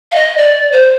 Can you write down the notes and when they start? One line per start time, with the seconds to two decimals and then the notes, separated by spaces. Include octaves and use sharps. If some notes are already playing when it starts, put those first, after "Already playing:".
0.12 F5
0.15 D#5
0.38 D5
0.72 C5